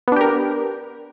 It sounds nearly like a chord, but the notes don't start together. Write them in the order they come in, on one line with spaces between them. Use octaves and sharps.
B3 D4 G4 A#4